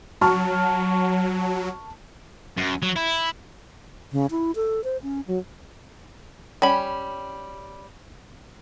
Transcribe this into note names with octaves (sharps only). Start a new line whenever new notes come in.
F#3 A5 C#6 F6
F#2
F#3
E4
C#3
E4
A4
C5
C#4
F#3
G3 C#4 B5